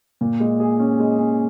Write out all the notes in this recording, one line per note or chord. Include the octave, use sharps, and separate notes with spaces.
A#2
G#3
G#4
C#4
G#3
C#4